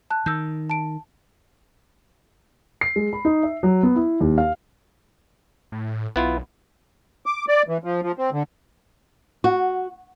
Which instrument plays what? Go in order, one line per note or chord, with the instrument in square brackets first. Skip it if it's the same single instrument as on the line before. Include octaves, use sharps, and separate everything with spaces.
[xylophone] A5 F#6
[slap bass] D#3 [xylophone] E6 G6
[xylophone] A5 D7
[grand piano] C7
G#3
B5
D#4
E5
F#3
B3
E4
D#2
F5
[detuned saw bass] A2
[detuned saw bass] B1 [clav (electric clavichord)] B3 E4 F4
[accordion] D6
D5
E3
F3
F3
C4
D3
[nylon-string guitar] F#4